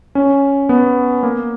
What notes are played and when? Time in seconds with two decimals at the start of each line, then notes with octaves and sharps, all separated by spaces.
0.15 C#4
0.69 B3
1.23 A#3